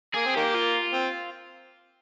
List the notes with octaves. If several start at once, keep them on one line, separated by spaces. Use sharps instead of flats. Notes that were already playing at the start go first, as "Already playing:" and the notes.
A#3 G#4
C4
D#3 A#3 G4
F4
C4